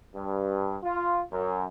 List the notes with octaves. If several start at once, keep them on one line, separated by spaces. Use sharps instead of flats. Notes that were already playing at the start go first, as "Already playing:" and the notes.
G2
F4
F#2